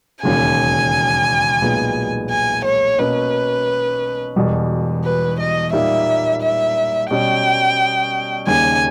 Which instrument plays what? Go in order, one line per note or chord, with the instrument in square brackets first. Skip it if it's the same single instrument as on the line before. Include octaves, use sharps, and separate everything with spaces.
[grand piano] E1 D#2 C#3 [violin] G#5
[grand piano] B1 A#2 G#3 B3
[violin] G#5
C#5
[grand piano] B2 A#3 C#4 [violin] B4
[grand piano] E1 E2 B2 G3
[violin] B4
D#5
[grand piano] A#2 G3 A#3 D#4 [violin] E5
[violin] E5
[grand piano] B2 G3 C#4 [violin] G5
[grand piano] D#2 C#3 G3 A#3 [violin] G#5